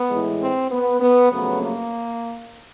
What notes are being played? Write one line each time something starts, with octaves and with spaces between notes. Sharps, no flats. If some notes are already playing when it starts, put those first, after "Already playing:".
Already playing: B3
A2 E3 G#3
C4
B3
B3
F2 C#3 F#3 A3 B3
A#3